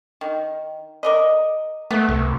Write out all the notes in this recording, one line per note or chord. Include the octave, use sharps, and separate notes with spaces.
D#3
A#4 D5 D#5
A3 B3
C2